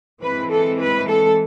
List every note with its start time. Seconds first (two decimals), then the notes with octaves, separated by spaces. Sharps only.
0.22 E3 G#3 C4 B4
0.50 A4
0.80 B4
1.09 A4